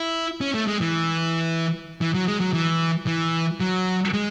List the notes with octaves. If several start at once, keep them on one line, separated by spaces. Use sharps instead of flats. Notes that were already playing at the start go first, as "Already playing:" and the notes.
Already playing: E4
C#4
A3
G#3
E3
E3
F#3
G#3
F#3
E3
E3
F#3
G#3